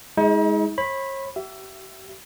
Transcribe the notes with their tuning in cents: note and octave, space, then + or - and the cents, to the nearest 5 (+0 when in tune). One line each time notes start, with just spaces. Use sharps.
G#3 +5 D#4 +45
C#5 -40 B5 +0
G4 -40 E5 +20